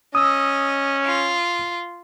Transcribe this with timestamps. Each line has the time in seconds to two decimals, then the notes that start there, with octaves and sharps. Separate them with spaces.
0.15 C#4 D#5 D#6 E6
1.04 F4